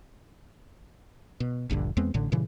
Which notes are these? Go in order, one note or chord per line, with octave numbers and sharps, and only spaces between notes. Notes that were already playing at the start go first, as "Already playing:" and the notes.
B2
D#1 A#1 G2 D3
E2 G#3 B3 C4
A1 A2 D3
G2 A#2 C#3 E3